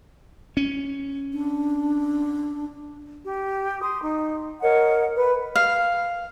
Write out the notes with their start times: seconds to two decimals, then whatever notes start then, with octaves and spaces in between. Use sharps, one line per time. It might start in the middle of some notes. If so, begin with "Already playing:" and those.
0.57 C#4
1.33 D4
3.26 G4
3.81 C6 D#6
4.01 D#4
4.61 A#4 C#5 D#5 F#5
5.15 B4
5.56 F5